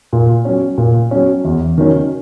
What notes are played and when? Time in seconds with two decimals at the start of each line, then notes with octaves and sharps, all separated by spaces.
0.13 A#2
0.45 F#3 C#4
0.78 A#2
1.11 F#3 C#4
1.45 E2
1.78 D#3 F#3 C#4